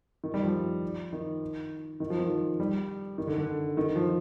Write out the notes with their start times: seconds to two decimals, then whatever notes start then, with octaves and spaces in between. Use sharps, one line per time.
0.24 D#3
0.34 G3
0.44 F3
1.13 D#3
2.00 D#3
2.10 F3
2.19 D#3
2.30 F3
2.60 G3
3.18 D#3
3.27 D3
3.38 D3
3.77 D#3
3.96 F3